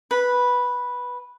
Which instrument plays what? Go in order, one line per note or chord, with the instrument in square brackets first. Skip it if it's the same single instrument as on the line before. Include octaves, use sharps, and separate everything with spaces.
[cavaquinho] B4 B5